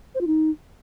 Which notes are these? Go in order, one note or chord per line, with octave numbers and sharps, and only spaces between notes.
C5
F4
D#4